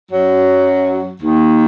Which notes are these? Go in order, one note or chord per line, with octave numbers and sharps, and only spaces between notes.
F#2 F#3
D#2 D#3